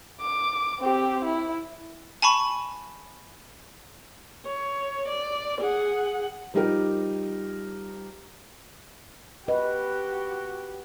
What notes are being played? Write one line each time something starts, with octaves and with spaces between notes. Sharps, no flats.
D6
C4 G4
E4
G#5 A5 B5 C#6
C#5
D5
G#4 F#5
F3 G3 D#4 G4 A#4
F#4 G4 B4 D#5